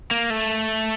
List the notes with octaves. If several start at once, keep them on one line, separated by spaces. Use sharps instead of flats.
A#3
A3